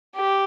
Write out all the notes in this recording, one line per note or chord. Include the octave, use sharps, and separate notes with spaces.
G4